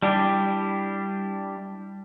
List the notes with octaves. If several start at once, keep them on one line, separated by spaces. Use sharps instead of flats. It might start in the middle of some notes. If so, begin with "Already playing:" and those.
G3 D4 E4 G4